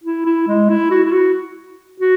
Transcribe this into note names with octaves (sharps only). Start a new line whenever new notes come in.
E4
E4
G#3
E4
F#4
E4
F#4
F#4